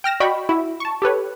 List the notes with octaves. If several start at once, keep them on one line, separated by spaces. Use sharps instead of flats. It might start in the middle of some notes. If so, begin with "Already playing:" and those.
G5 F6 A#6 E7
F#4 D5 D#5 G5 B5 C#6
E4 F#4
A5 C#6
G4 A4 B4 C#5